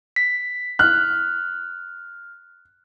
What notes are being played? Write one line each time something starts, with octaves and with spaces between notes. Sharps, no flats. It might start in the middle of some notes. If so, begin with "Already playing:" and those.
B6
F6 F#6